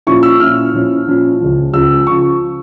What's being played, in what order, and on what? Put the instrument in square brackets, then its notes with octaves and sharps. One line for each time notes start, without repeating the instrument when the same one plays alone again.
[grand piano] A#2 F3 C#4 E4 C#6
E6
A#2 F3 C#4 E4 F6
A#2 F3 C#4 E4
A#2 F3 C#4 E4
C#2 C#3 F3
C#2 C#3 F3 E6
C#3 F3 C#6